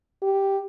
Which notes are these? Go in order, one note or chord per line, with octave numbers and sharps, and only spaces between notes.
G4